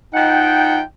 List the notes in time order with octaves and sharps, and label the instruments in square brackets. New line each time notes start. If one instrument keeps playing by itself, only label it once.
[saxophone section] F3 F#5 [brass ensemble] D#4 G5